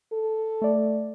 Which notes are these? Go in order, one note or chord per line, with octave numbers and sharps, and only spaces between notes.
A4
A3 D5